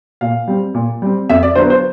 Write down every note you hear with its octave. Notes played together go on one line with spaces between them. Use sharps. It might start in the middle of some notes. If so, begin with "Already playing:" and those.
A#2 F5
G3 C4
A#2
G3 C4
F2 E5
D5
D3 F#3 B3 C5
C5